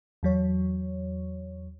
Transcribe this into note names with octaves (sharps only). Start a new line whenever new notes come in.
E2 F#3 C#5